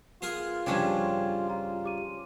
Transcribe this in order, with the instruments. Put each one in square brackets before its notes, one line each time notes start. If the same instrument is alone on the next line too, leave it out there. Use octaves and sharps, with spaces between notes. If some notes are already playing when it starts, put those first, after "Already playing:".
[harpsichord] B3 G#4 A#4 [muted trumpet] F4 [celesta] C7
[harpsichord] G2 C#3 [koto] F3 C#4 D4 [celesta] G5 G#6
[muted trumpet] F4 [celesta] A#5
[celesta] G4 D6 D#7